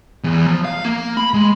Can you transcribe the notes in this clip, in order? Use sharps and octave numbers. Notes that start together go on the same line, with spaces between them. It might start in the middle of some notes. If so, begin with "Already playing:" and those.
E2
F3
F5
A#3
B5
G#3